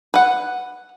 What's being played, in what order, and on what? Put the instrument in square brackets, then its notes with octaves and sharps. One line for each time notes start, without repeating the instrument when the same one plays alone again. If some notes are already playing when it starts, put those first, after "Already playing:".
[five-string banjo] B4 F#5